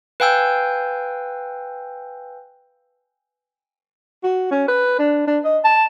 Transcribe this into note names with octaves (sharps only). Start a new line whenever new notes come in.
B4 F5 G5 G#5 E6 G6
F#4
C#4
B4
D4
D4
D#5
A5